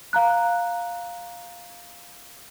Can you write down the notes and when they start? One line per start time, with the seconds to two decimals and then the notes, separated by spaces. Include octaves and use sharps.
0.13 F5 A#5 F#6